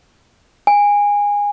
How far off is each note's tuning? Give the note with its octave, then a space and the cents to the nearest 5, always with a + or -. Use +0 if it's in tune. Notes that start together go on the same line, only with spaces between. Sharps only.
G#5 -20